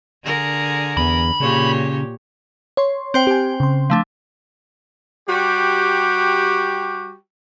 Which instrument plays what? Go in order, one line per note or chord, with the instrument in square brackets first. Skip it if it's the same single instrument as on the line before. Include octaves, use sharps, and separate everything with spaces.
[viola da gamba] D3 G#4 A#4
[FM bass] E2 [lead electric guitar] B5
[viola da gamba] A#2 G4 C#5 [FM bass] C#3
[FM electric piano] C#5 C6
[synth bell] C4 C5 G5
[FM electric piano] G4 G#5
C#3 C6
[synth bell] F3 A3 D4
[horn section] G3 F#4 G4